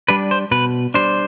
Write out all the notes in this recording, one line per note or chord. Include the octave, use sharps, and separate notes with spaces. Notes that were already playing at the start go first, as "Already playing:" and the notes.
G3 D4 B4
C5
B2 B4
G3 D4 C5